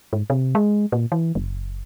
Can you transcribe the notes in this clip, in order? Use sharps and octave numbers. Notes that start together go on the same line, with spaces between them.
G#2
C3
G#3
A#2
E3
F#1